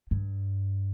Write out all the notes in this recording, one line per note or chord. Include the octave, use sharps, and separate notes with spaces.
G2